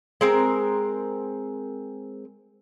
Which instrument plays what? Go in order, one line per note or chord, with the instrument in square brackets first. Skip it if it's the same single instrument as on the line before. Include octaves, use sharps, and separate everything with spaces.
[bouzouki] G#3 C4 A#4